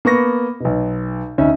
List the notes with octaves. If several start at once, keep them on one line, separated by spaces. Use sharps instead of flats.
A#3 B3 C#6 A#6
B1 B2
D2 C#4 D#4 E5